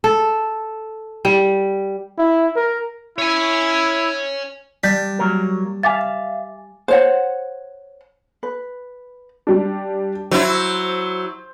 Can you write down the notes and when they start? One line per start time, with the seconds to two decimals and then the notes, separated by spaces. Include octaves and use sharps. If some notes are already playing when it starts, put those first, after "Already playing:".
0.04 A4
1.25 G3
2.18 E4
2.56 A#4
3.18 E4 C#5 G#5
4.84 G3 D4 G6 B6
5.19 F#3 A#3 A#4
5.83 E5 F5 G#5 D6 A6
6.88 C5 C#5 F#5
8.43 B4
9.47 G3 D4
10.31 F#3 E4 C5